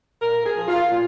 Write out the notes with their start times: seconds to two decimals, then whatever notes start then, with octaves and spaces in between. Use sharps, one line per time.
0.22 A#2 A#4
0.46 G#4
0.56 F3
0.68 F4
0.91 A#2